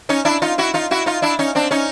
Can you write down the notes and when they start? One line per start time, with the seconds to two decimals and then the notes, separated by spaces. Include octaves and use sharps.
0.09 C#4 D#4
0.25 D4 E4
0.42 D#4 F4
0.58 E4 F#4
0.74 D#4 F4
0.91 E4 F#4
1.06 D#4 F4
1.22 D4 E4
1.39 C#4 D#4
1.55 C4 D4
1.71 C#4 D#4